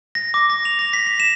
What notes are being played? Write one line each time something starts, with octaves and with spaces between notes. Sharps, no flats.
A#6
D6
A#6
F7
A#6
B6
B6
E7